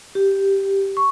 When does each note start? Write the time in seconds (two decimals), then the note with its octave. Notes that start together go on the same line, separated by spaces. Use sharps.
0.15 G4
0.97 C#6